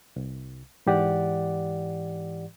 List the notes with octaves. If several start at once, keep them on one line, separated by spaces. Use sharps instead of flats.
C2
G#2 E3 G4 D5 F#5